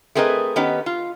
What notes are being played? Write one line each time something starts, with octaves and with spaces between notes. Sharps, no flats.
A3 C4 G#4 A#4 B4 D#5
D#3 B3 C#4 D#4 G4 B4
F4